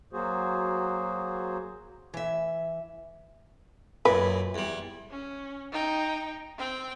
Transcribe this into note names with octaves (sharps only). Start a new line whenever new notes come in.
F#3 A#3 F#4 G#4 C5
E3 E5
F#2 A#2 B4
E2 G3
C#4
D#4 G5
C4 G5